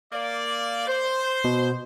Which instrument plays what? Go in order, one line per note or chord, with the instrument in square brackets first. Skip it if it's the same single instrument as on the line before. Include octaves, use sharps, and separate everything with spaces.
[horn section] A#3 D5
C5
[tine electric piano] B2